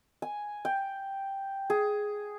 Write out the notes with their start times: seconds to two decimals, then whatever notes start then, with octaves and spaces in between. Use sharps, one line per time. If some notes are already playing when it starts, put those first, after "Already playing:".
0.22 G#5
0.65 G5
1.70 G#4